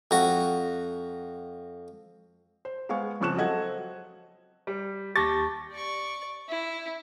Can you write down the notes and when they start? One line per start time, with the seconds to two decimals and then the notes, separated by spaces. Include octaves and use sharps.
0.11 F2 F#4
2.65 C5
2.89 G#3 B3 F5 G#5 C#6
3.20 F2 C#3 F3 C#6 F#6 E7
3.37 F#3 C4 A4 D#5 F#5 G#6
4.67 G3
5.16 D#2 G4 A5 C#6 A6 A#6
5.72 D5 C#6
6.49 E4